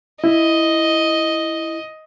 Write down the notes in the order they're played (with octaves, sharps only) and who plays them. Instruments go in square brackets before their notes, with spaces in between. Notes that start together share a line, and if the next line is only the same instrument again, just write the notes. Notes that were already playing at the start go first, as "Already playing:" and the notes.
[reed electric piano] E4 [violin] D#5